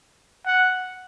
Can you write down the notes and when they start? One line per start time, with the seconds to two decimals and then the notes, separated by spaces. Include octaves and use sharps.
0.46 F#5